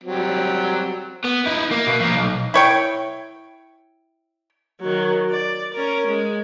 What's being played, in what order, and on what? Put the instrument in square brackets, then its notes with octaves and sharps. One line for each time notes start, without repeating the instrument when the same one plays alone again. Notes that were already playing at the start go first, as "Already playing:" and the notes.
[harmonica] F#3 G3 C4
[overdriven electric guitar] B3
D#4 E4
A#3
B2
F3 A#3
B1
[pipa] E4 C#5 G5
[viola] D#3 F#3
D5
C#4 A#4
G#3